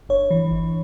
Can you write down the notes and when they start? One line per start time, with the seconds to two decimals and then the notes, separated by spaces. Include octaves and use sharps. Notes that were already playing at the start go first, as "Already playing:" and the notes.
0.09 G1 C#5
0.31 E3
0.51 G1